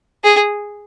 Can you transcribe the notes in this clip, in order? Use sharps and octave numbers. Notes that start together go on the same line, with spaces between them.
G#4